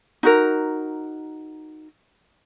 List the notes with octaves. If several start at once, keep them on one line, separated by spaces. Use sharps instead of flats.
D#4 F#4 A#4